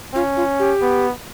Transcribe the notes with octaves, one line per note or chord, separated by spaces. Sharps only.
C#4 F4
F4
G4
B3